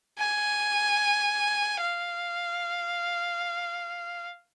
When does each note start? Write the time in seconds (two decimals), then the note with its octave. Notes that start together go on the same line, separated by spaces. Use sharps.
0.19 G#5
1.81 F5